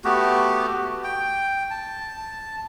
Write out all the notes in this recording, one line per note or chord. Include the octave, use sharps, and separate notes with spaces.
A3 B3 F#4 G4
G5
A5